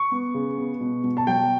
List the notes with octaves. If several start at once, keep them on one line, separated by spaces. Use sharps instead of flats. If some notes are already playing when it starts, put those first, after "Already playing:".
Already playing: C#6
B3
C#3
B3
B2
B2
A5
F#3 G5